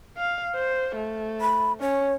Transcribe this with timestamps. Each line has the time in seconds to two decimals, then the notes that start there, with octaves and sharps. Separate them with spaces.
0.18 F5
0.55 C5
0.96 A3
1.41 B5
1.81 C#4 C#5